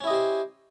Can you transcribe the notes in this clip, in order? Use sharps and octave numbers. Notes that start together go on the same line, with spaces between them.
C#4 E4 G4 C5 D#5